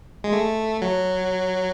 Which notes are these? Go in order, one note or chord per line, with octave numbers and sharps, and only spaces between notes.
G#3
A3
F#3